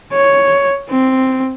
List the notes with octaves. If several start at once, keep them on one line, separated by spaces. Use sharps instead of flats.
C#5
C4